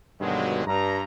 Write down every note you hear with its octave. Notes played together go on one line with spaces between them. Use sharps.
G2 B2 D3 D#3 F#3 G#3
G2 A#5